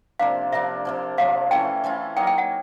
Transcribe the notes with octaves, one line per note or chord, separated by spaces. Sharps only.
C3 F3 A#3 D4 F5
C3 F3 A#3 D4 E5
C3 F3 A#3
C3 F3 A#3 F5
E3 A3 C#4 F4 G5
E3 A3 C#4 F4
F#3 A#3 D#4 G5
G5
F#5